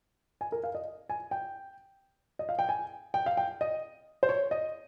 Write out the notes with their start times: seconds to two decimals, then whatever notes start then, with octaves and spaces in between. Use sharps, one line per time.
0.41 G#5
0.52 A#4
0.64 F5
0.75 D#5
1.09 G#5
1.31 G5
2.39 D#5
2.49 F5
2.59 G5
2.69 G#5
3.14 G5
3.26 F5
3.37 G5
3.61 D#5
4.23 C5
4.29 C#5
4.51 D#5